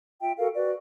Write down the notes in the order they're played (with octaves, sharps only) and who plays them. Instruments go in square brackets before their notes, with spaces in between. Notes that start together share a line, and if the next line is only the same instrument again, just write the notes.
[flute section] F4 E5 G5
F#4 A4 A#4 F5
F#4 B4 D5